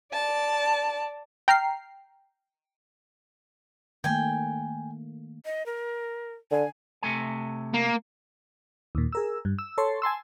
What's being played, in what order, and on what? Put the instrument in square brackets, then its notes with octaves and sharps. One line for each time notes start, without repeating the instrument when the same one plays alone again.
[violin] D5 A5
[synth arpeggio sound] G5 A#5 F6 C7
[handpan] D#3 A3 A#3 [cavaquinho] G5 G#5
[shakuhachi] D#5
A#4
[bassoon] D3 [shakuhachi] G#5
[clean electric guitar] C3 A3 G#5
[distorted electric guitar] A#3
[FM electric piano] D#2 A#2
G#4 A#4 E6
G2
E6
A4 C#5 A5 C6
G#5 A5 C6 E6